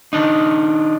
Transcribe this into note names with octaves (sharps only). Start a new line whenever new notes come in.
D#3 D4 D#4